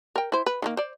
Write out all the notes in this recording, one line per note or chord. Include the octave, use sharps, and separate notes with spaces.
A#4 G5
E4 C5
B4
D#3 A3 A#3
C5 D5